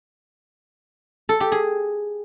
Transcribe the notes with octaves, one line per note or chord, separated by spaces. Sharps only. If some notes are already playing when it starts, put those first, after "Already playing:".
A4
G4
G#4